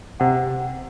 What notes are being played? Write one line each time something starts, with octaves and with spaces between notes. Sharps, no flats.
C3 F#5